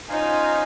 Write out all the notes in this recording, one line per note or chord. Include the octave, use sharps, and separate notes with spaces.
C#4 D#4 F4 C5 F5 G#5